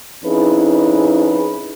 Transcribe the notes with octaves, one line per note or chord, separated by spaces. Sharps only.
F2 C#4 D#4 E4 G#4 B4